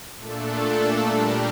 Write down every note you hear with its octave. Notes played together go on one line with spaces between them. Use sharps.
A#2 A3 D4 A4
G3 D4 G4 A#4